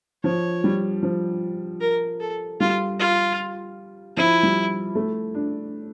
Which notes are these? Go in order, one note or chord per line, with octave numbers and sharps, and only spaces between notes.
F3 C#5
G3
F3
A#4
A4
G3 F4
F4
F3 E4
G3
A3
D4